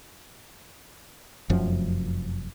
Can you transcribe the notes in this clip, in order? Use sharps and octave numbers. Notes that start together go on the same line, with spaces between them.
F1 F#2 F3